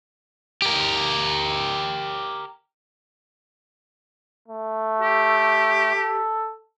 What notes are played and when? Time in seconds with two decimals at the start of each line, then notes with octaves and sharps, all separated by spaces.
0.62 G4 A#4
4.48 A3
5.01 G4
5.95 A4